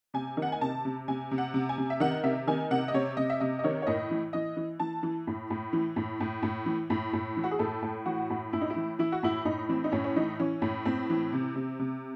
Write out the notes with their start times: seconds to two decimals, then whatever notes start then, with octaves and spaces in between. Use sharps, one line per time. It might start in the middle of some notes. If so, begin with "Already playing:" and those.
0.14 C3 G#5
0.37 D#3
0.42 F#5
0.52 G#5
0.61 C3 A5
0.85 C3
1.08 C3 G#5
1.31 C3
1.38 F#5
1.54 C3
1.69 G#5
1.78 C3
1.90 E5
2.00 D#3 F#5
2.23 C3 E5
2.47 D#3 G#5
2.71 C3 F#5
2.88 D#5
2.94 C3 C#5
3.17 C3 D#5
3.30 E5
3.40 C3 D#5
3.59 D#5
3.64 D#3 C#5
3.82 C#5
3.87 A2 D#5
4.11 E3
4.33 E3 D#5
4.57 E3
4.80 E3 A5
5.03 E3
5.27 A2
5.50 A2
5.73 E3
5.96 A2
6.20 A2
6.43 A2
6.66 E3
6.90 A2
7.13 A2
7.37 E3
7.44 F#4
7.51 G#4
7.59 A2 A4
7.82 A2
8.06 E3 F#4
8.30 A2
8.53 A2 E4
8.61 D#4
8.70 E4
8.76 E3
8.99 E3 E4
9.12 F#4
9.23 A2 E4
9.45 A2 D#4
9.69 E3 C4
9.84 D#4
9.92 A2 C#4
10.04 C#4
10.16 E3 D#4
10.39 E3 C#4
10.62 A2
10.85 A2 C4
11.10 E3
11.33 C3
11.56 C3
11.79 C3